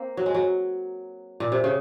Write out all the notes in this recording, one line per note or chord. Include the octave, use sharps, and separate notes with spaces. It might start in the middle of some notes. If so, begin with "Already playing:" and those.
Already playing: A#3 C4
F#3
G#3
F#3
A#2
C3
C#3